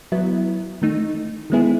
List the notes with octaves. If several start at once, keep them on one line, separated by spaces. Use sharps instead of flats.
F#3 B3 E4
D#3 A3 D#4
D#3 G#3 B3 E4 G#4